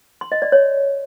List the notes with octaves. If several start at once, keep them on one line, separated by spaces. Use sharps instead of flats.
C6
D#5
D5
C#5